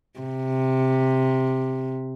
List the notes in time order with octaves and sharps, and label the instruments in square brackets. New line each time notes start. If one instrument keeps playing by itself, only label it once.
[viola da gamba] C3